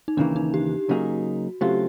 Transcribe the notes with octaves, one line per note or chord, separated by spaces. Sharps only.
D#4
D#2 C#3 E3 G3 A#3 D4
D#4
G4
C#3 F#3 A#3 D#4 F#4 G#4
C#3 F#3 A3 C4 F4 G4